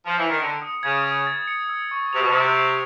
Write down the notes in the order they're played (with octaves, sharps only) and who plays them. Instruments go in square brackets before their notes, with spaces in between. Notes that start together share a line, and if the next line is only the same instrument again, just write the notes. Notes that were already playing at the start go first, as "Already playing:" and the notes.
[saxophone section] F3
E3
D#3
[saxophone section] D3 [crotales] C#7
[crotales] D#6
[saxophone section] C#3 [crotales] G#6
[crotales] D#6
A6
C#7
E6
C#6
[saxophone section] C3 [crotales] F7
[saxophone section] B2
C3
[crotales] A6
C7